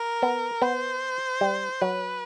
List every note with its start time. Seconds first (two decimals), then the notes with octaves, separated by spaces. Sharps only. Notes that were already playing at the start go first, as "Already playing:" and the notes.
Already playing: A#4
0.22 B3
0.62 B3 C5
1.41 G3
1.81 F#3 B4